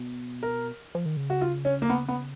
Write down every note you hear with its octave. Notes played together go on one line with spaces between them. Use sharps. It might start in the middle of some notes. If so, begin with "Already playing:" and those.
Already playing: B2
A#4
F3
D#3
C#3
F#4
F4
C#4
A#3
B3
B3